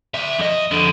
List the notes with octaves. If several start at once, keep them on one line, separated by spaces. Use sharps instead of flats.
D2 E5
F2 D#5
F2 D3